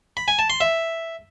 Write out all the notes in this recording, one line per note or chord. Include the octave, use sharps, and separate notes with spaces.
B5
G#5
A5
C6
E5